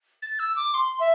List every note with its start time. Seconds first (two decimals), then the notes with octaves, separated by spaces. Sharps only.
0.22 A6
0.39 E6
0.56 D6
0.74 C6
1.00 E5